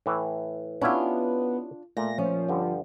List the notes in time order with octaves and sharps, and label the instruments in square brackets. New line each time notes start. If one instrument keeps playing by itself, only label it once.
[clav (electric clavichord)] A2 E3
[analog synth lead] B3 [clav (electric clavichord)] C#4 E4 G4 [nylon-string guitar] D4 F4
[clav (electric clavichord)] A#2 [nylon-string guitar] A3 [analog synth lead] A#6
[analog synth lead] F3 [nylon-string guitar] C#4
[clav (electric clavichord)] G2 D3